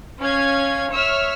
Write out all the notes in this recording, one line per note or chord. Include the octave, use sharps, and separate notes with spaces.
C#4 F5 G#6
C#5 E5 E6 F6